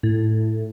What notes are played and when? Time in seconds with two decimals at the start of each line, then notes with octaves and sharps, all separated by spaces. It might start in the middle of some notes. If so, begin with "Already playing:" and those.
0.03 A2